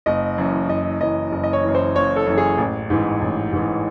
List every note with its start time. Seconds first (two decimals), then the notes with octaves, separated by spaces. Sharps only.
0.06 F#1 D#5
0.38 F#2 E3
0.69 F#1 D#5
1.01 F#2 E3 D#5
1.32 F#1
1.44 D#5
1.53 C#5
1.64 F#2 E3
1.75 C5
1.95 F#1 C#5
2.16 A4
2.26 F#2 E3
2.38 G#4
2.58 A1
2.90 G#2 E3
3.22 A1
3.52 G#2 E3